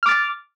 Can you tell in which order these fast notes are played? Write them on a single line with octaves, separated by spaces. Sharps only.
F6 D6 A6